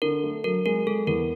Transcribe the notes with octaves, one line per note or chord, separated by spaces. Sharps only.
D3 A#4
A3
F#3 A#4
G#3 A#4
G#3 A4
E2 A#4